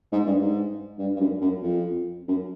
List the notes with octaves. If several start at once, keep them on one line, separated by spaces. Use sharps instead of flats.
G#2
G2
G#2
G2
G2
F#2
F#2
F2
F#2